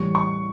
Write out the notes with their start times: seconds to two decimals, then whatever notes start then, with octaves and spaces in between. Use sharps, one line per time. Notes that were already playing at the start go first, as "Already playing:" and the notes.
Already playing: A2 E3 G3 C#6
0.15 C#6